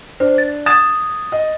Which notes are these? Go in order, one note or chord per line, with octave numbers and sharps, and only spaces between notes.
D4 C5
A6
D#6 G#6 A6 E7
D#5